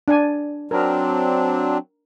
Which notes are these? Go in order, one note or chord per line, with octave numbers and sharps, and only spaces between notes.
D4 D5 G#5
F#3 C4 D4 A#4